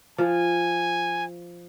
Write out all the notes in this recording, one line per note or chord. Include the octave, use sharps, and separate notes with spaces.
F3 G#5